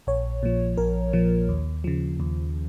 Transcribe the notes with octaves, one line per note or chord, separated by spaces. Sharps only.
A#1 C#5
A#2 F3
A#1 A#4
A#2 F3
D#2
C#3 F3
D#2